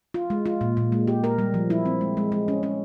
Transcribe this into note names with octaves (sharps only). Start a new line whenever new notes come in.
F4
G#3
F4
A#2
A#2
G#3
G4
A#4
G3
F3
E4
C4
G#3
G#3
G#3
C#4
C#4